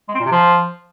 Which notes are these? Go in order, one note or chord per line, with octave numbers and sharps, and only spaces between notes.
G#3
C4
A#2
C3
F3